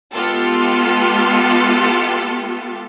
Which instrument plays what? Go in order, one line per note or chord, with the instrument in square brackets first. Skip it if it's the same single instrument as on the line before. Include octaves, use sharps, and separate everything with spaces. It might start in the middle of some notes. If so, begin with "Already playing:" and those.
[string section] G#3 B3 F4 G4 A4